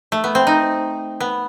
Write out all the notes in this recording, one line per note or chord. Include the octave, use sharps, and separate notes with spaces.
A3
B3
C4
D#4
B3